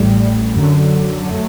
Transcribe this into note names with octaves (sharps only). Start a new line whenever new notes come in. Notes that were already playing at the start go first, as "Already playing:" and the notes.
Already playing: A1 A2 G3
F#2 D3 F#3
F#3 A3